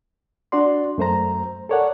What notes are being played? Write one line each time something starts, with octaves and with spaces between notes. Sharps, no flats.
D4 F#4 D5 C6
F#2 A3 C5 A#5
A4 A#4 C#5 D5 F#5